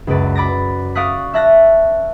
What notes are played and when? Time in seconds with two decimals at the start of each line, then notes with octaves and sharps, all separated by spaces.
0.07 C#2 F#2 B4 D5
0.35 B5 D6 A6 A#6
0.95 D5 F5 C#6 D#6 F#6 B6
1.34 E5 A5 F#6 A6 A#6